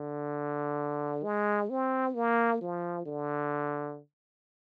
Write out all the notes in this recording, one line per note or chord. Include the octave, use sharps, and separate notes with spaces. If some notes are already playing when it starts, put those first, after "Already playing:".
Already playing: D3
G#3
C4
A#3
F3
D3